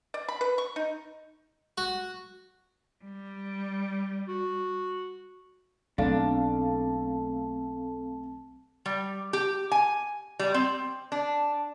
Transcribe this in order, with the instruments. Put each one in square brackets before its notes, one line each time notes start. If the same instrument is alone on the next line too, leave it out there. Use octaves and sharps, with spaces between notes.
[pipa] D5
B5
B4
C#6
D#4
[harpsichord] F#4
[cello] G3
[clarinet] F#4
[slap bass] B1 [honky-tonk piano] A3 F5 [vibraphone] C4 A5 [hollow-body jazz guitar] D4
[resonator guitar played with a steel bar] G3
G4
G#5
G3
C4
D4